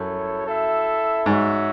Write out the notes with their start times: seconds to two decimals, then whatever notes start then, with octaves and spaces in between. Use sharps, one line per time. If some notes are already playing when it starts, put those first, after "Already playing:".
Already playing: F#2 E4 A4 C#5
0.45 E4 A4 E5
1.26 G#2 F#4 C#5 E5